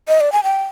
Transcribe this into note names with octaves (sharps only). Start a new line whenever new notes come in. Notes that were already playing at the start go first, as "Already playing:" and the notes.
D#5
D5
G#5
G5